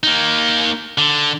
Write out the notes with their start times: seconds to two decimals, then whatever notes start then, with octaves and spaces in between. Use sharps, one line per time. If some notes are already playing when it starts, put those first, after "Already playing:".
0.03 A#3 D#4
0.98 D3